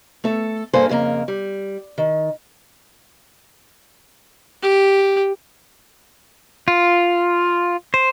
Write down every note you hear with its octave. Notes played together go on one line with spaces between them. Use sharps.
A3 A4
G2 A#3 A4 C5 G#5
F2 C#3 A#3 A#5
G3
D#3
G4
F4
C5